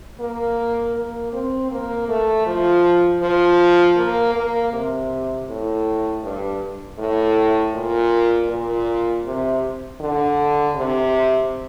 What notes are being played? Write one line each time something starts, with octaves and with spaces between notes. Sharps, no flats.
A#3
A#3
C4
A#3
A3
F3
F3
A#3
A#3
C3
A2
G2
A2
A#2
A#2
C3
D3
C3